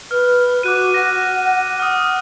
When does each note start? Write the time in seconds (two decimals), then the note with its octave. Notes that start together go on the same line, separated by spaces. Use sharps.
0.11 B4 F6
0.63 F#4 D6 F#6 D#7
0.94 F#5 A#6
1.80 D#6 F6